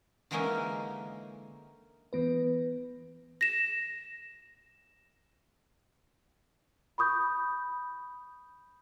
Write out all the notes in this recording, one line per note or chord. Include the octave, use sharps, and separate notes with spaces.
D3 E3 G#3 A#3 C#4 D#4
E3 B3 B4
A#6 E7
B5 C#6 D#6 G6